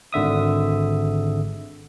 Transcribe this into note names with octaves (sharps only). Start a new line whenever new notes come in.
G#1 D3 E5 D#6